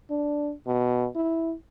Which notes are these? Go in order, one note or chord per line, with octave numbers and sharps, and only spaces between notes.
D4
B2
E4